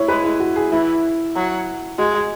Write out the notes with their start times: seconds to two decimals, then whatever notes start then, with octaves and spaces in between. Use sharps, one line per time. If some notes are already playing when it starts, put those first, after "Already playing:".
Already playing: E4 C#5
0.08 G#3 B4
0.24 E4
0.40 F#4
0.56 G#4
0.72 E3 E4
1.35 F#3
1.98 G#3 F#4
2.14 G#4